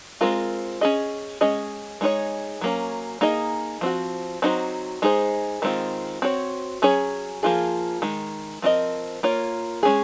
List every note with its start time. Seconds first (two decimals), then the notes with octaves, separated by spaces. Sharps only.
0.21 G#3 C4 F4 A#4
0.81 C#4 G#4 D#5
1.41 G#3 C#4 G#4 D#5
2.01 G#3 D#4 G#4 C#5
2.61 F#3 A#3 C#4
3.21 A#3 D#4 G#4 D#5
3.81 F3 C4 F#4
4.42 F#3 C4 D#4 F#4 C5
5.02 G#3 D#4 G#4 C5
5.62 D#3 G#3 C4 F4
6.22 C4 F#4 C#5
6.82 F#3 C#4 G#4 C#5
7.43 F3 A#3 F4 G#4
8.02 D#3 G#3
8.62 F3 C4 F4 A#4 D#5
9.23 A#3 F4 A#4 C#5
9.83 G#3 C#4 G#4